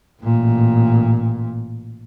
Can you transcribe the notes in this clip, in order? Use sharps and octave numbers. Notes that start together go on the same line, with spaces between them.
A1 A#2